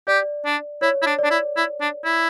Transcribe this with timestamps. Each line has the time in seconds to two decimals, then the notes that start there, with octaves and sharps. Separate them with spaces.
0.08 G4 D5
0.46 D4
0.82 E4 C#5
1.02 E4
1.06 D4
1.19 D5
1.24 D4
1.31 E4
1.57 E4
1.81 D4
2.05 E4